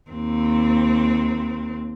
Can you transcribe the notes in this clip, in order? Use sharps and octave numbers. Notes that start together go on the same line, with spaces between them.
D#2 C4